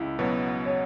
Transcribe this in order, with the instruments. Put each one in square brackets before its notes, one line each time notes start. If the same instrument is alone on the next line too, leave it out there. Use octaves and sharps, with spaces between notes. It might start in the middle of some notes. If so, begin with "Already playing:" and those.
Already playing: [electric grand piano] C#2 [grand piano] E4
[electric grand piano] B2 F#3 B3
[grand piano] C#5